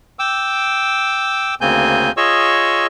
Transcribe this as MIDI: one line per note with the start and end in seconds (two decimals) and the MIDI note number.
0.19 1.55 79
0.19 1.55 86
0.19 1.55 88
1.61 2.12 38
1.61 2.12 49
1.61 2.12 58
1.61 2.12 60
1.61 2.12 80
1.61 2.12 91
2.17 2.87 65
2.17 2.87 68
2.17 2.87 73
2.17 2.87 75
2.17 2.87 85
2.17 2.87 88